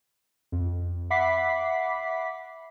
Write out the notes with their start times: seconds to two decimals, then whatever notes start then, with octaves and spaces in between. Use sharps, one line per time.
0.52 F2
1.10 E5 F#5 B5 D6 B6 C7